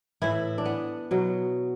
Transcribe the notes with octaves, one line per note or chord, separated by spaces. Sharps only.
A2 E3 E4
D4
B3
B2 F#3